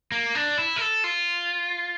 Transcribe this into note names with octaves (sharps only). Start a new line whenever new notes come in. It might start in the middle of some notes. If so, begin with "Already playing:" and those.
A#3
D4
E4
A#4
A4
F4